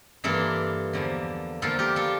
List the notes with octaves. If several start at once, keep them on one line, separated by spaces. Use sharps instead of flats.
G2 E3 A#3 F4 A4
E2 D3 F3 A#3
E2 D3 F3 A#3 F4 A4
G4 A#4
F4 A4